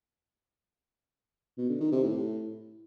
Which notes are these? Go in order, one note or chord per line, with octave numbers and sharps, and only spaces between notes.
B2
D3
D#3
C3
A2